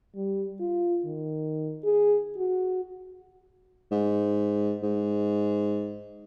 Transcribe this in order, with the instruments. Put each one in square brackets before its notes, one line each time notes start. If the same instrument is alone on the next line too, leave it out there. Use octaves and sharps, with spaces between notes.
[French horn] G3
F4
D#3
G#4
F#4
[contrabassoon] G#2
G#2